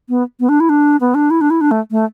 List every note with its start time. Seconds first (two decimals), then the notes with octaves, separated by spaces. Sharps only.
0.09 B3
0.40 B3
0.49 D4
0.60 E4
0.69 D4
1.01 B3
1.15 D4
1.31 E4
1.41 D4
1.50 E4
1.61 D4
1.71 A3
1.91 A3